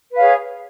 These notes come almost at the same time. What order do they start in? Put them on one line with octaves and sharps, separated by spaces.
B4 F5 C#5 G#4